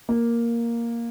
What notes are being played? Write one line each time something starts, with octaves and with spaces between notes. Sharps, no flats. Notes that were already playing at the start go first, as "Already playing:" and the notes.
A#3